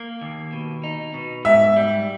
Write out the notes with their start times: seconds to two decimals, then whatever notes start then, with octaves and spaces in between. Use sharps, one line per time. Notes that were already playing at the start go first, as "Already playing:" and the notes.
Already playing: A#3
0.21 D#2
0.53 B2
0.84 D#4
1.14 B2
1.45 G#2 E5
1.76 G3